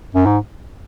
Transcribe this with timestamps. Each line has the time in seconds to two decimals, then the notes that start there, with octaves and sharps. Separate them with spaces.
0.15 F#2
0.26 G#2